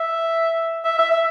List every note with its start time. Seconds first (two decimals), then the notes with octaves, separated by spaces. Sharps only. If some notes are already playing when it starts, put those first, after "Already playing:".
Already playing: E5
0.85 E5
0.99 E5
1.11 E5